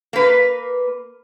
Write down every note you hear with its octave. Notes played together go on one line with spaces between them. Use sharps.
A#3 B4